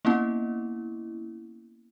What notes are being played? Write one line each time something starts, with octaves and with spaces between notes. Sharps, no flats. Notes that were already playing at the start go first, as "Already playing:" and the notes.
A#3 B3 C#4 E4